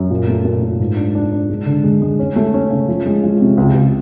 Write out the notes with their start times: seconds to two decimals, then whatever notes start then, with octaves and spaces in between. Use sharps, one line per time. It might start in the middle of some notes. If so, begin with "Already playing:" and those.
Already playing: F#2
0.10 A#2
0.28 A3
0.45 A#2
0.63 A#2
0.80 G#2
0.96 D4
1.15 D4
1.32 D4
1.49 G#3
1.66 D3
1.84 G#3
2.02 G#3
2.19 C#4
2.36 A3
2.54 C#4
2.71 C#3
2.88 F3
3.06 G#3
3.23 F3
3.40 C3
3.57 C#2
3.74 C#2